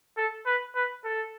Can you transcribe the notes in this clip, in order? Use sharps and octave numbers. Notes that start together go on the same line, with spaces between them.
A4
B4
B4
A4